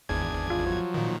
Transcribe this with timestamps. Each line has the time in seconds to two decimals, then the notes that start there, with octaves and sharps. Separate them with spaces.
0.09 G#1 E2 D4 G#4 G#6
0.50 F4
0.66 F3 F#3
0.94 A#2 D#3